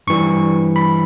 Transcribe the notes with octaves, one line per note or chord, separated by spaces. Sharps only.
G2 E3 G3 C#6
B5